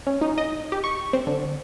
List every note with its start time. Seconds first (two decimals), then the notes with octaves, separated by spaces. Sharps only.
0.07 C#4
0.21 D#4
0.38 D#5
0.72 G4
0.84 C#6
1.13 C4
1.27 D3